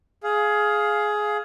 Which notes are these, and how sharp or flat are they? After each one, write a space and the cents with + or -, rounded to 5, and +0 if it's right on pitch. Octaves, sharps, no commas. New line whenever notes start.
G#4 +15 F5 +0